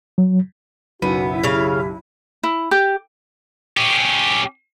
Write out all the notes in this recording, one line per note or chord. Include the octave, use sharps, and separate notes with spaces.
F#3
F#1 B1 B3 E4 F#4 D#7
C#3 G4 F5
E4
G4
C#4 G4